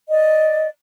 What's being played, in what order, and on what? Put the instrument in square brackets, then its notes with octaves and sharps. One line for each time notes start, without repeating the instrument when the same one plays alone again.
[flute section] D5 D#5